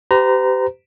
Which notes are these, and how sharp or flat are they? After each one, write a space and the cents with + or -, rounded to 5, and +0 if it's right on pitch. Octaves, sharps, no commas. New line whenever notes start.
G4 -20 C5 -45 A#5 +0